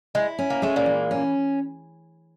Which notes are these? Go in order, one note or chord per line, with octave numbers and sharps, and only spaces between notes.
G#3 E4
C#4
A#3
G#3 A3
A#2 A#3
E3
C#4